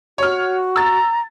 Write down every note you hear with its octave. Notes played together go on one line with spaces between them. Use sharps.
F#4 C#5 F6
A#5 E6 A6